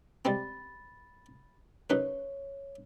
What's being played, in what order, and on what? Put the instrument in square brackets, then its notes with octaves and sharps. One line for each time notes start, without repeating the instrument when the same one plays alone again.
[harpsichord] G3 G#3 C4 [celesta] B5 A6
[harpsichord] F#2 D#4 B4 [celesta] C#5